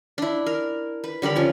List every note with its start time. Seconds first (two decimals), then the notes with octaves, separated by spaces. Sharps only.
0.18 D4 E4
0.46 A#4
1.04 B4
1.22 D3 G3 A#4 B5
1.36 F3 C#4